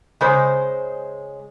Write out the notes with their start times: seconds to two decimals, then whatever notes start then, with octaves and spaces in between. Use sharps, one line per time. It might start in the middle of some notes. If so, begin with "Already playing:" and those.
0.21 C#3 G#3 C5